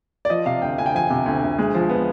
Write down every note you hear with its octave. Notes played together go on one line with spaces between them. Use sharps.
D5
F3 D#5
C3 F5
D2 G5
D2 G#5
G5
F3 G#5
C3
D2
D2
G#3
F3
B3